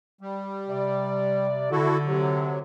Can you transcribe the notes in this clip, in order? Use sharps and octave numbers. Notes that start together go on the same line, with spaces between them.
G3
C3 D5
D3 E4 F#4 A4
C3 F#3